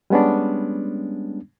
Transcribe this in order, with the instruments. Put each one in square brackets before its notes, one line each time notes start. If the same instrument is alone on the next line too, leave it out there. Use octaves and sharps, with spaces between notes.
[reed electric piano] G3 G#3 B3 C#4 D4